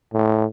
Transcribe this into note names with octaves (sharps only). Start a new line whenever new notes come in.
A2